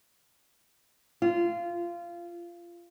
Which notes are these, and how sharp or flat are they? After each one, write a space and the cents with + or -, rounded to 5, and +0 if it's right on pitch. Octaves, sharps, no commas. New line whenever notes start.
F4 -20